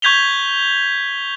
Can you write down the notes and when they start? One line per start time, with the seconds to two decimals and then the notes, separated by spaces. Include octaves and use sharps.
0.02 C#6 G6 G#6 B6 F7 G7